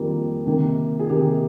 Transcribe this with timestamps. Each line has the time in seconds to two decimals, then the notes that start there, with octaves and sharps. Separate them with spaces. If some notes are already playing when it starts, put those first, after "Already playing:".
Already playing: F2 D#3 G3 A#3 G#4
0.46 C3 D#3 A#3
0.99 G#4
1.09 C3 D#3 A#3 G4